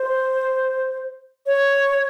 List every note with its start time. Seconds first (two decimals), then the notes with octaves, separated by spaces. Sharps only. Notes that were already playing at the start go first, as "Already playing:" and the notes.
Already playing: C5
1.46 C#5